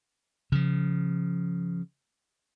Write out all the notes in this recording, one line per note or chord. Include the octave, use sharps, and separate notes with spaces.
C#3 F3